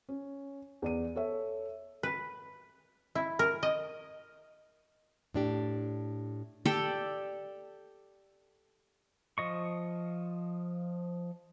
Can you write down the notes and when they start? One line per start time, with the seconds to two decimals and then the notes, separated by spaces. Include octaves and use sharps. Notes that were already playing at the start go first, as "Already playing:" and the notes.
0.09 C#4
0.82 E2 D5 D#7
1.16 A4 C#5 E5
2.03 B4
3.15 E4
3.39 A#4
3.63 D#5
5.34 A2 D4 G4
6.65 G4 A4 D5 G5
9.38 F3 D#5 C#6